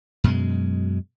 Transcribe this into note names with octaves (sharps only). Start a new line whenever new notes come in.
F#2 B2 G#3